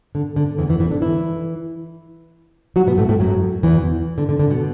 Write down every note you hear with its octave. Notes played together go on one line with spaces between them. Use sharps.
D3
D3
E2 E3
E2 E3
E2 E3
D3 D4
E3 E4
F#3 F#4
B2 B3
A2 A3
A2 A3
F#2 F#3
E2 E3
D3
D3
D3
B2